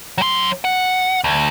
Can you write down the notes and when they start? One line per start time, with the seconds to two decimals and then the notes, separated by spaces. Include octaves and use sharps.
0.18 F#3 C6
0.64 F#5
1.24 D2